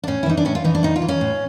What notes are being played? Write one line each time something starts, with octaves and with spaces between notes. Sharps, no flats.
D4
A2 C#4
E4
E3 D#4
D4
A2 C#4
F4
E3 D#4
D4
A2 D#4
F4
E3
C#4
A2